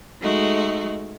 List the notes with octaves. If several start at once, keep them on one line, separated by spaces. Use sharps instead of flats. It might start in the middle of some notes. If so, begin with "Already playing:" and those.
G#3 A3 D#4 F#4